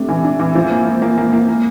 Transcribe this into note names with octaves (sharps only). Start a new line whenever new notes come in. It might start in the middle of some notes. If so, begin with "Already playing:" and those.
Already playing: C3 A3 D4
E3
D4
E3
F3
A#3
A#3
A#3
A#3
A#3
A#3